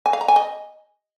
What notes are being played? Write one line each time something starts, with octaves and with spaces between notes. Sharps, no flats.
G#5
F5
A#5
G#5
D#5